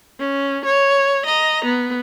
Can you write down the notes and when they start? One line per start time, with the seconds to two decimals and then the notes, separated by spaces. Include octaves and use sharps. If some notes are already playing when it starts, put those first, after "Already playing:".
0.20 C#4
0.65 C#5
1.26 D#5 A#5
1.65 B3